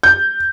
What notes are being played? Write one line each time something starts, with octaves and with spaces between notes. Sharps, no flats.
G6